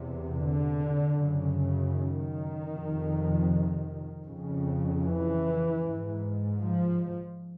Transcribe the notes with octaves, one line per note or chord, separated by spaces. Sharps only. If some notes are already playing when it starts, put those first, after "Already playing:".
Already playing: E2 C3
D3
F#2 C#3
D#3
F2 C3
F2 C#3
E3
G#2
F3